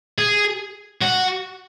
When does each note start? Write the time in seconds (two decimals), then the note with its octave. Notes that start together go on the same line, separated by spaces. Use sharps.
0.18 G#4
1.01 F#4